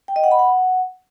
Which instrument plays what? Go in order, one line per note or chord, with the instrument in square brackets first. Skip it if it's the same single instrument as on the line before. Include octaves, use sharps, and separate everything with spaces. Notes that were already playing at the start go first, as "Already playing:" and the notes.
[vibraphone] G5
D#5
F#5
B5
F#5